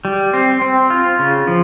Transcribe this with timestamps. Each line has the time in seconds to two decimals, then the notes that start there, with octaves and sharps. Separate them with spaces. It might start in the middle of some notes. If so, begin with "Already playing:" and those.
0.05 G3
0.33 C4
0.62 C4
0.90 F4
1.19 C#3
1.47 F3